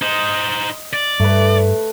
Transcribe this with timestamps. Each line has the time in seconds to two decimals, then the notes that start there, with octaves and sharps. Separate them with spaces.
0.02 D#4 C5 D#5
0.93 D5
1.20 G2 A3 B4